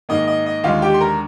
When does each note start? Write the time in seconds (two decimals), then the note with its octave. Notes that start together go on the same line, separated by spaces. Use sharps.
0.09 G#2 D#3 A#3 D#5
0.27 D#5
0.46 D#5
0.64 D#2 D3 G#3 F4 F5
0.82 G4 G5
0.94 C6
1.00 A#4 A#5